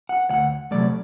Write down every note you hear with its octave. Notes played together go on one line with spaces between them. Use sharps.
F#5
D2 F#5
C3 F#3 A3 D5